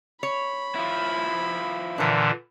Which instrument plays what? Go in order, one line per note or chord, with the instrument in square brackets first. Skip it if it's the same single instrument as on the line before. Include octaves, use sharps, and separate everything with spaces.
[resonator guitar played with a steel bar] C#5 [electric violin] B5
[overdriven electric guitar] F3 E4
[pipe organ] A#2 D3 E3 [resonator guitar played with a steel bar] D4 A#4